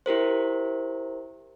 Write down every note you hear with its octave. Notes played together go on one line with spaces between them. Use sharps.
E4 G4 A#4 C5